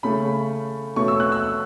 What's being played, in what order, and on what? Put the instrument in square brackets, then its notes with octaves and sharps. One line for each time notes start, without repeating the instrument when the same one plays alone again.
[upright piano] C#3 A3 C#4 B5
B2 A3 C#4 C#6
E6
F#6
E6